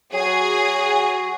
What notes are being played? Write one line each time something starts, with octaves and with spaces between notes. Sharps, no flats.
F#3 F#4 G#4